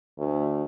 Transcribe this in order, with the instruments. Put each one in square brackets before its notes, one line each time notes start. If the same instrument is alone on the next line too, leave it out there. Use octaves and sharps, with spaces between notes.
[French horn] D2